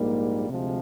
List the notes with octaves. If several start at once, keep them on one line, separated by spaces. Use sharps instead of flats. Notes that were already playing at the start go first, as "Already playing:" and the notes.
Already playing: A#1 G#2 G3 A#3
D2 C3 F3 G#3